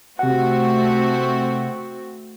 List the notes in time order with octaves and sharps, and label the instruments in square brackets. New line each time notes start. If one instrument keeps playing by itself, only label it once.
[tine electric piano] C3 F#5 [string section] A3 C4 F#4